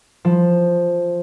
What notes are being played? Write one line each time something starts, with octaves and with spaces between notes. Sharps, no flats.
F3